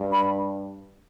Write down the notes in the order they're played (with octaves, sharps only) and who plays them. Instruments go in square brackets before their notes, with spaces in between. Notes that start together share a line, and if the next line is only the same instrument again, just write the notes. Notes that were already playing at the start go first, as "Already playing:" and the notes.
Already playing: [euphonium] G2
[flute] B5